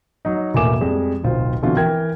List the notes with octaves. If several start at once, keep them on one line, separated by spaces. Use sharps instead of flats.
F#3 D#4
E1 A2 A#3 G#5 D6 E7
F2 G3 G#3
D1 B1 F4 C5
B2 D3 E3 C4 F4 F#4
E3 A#4 G5 G#6